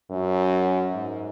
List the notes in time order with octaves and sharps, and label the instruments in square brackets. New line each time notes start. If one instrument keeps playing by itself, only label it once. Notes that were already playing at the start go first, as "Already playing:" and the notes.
[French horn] F#2
G#2